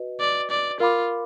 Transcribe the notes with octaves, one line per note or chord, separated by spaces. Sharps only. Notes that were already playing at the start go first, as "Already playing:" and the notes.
Already playing: F#4 B4 D#5
D5
D5
F4 A#4 F5 B5 D6